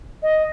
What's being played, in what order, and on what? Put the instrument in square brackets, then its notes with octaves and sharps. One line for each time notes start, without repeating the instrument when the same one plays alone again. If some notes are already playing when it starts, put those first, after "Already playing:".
[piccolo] D#5